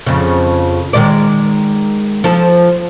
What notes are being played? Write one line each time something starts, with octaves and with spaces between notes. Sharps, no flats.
F2 C#3
D#3 G#3 D5
F3 A4